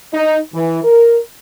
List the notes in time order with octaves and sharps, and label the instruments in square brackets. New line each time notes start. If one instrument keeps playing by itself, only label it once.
[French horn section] D#4
E3
A#4